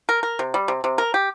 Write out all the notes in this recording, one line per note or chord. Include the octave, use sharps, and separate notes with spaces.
A#4
A#4
C3
G3
C3
C3
A#4
G4